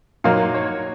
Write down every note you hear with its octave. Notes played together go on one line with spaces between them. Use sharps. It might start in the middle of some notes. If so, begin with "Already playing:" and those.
A#2 F#3 A#3 D#4 F5
C#5